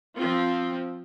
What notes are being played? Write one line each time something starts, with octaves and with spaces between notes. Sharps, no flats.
F3 C4 F4